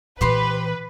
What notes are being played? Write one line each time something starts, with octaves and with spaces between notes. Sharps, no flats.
A#2 E3 G4 B4 C5 B5